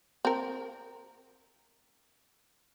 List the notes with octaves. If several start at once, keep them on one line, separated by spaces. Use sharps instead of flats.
C4 A#4